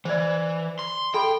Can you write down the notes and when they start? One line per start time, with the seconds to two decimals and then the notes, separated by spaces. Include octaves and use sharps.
0.05 E3 C5 D5
0.79 C6
1.14 A4 G5 B5